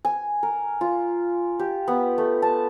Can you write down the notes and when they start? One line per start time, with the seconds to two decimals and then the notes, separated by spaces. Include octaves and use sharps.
0.05 G#5
0.43 A#4
0.81 F4
1.59 G4
1.88 B3
2.18 A3
2.42 A5